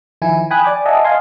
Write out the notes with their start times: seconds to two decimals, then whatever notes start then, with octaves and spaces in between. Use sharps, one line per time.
0.22 D#3 F3 E4 G#5
0.51 G5 G#5 B5 D#6 F#6
0.64 D5 G#5 D6
0.86 D#5 E5 F#5 G#5 A5
1.04 D#5 F5 G#5 C6